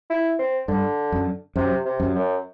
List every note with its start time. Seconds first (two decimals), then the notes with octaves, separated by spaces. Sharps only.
0.10 E4
0.39 C4
0.68 G2 D3
1.12 F#2
1.56 F#2 C3
1.85 C3
2.00 F#2
2.15 F#2